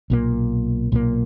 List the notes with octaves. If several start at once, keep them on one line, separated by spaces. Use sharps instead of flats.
B1 A#2 F#3 A#3
B1 A#2 F#3 A#3